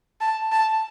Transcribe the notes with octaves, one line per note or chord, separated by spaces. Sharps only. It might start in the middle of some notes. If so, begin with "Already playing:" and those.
A5
A5